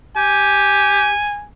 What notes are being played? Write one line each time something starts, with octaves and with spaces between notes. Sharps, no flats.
G4 G#5